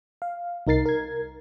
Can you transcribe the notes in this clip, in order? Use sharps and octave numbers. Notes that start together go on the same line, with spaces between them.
F5
C2 D#4 A#4 A6 C7
A#4 G#6